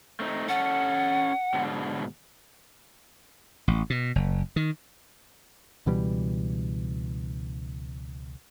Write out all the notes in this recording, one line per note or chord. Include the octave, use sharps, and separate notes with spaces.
A3 C4 D#4
C#4 A4 F#5
G#2 B2 D3
A1
B2
F#1
D#3
C#2 B2 E3 G3